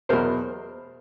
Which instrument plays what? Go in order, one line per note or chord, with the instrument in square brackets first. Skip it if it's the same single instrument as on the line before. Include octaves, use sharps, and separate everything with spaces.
[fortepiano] E2 B2 F#3 A#4 C5